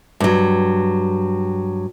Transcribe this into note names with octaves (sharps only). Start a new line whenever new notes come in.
G2 F#3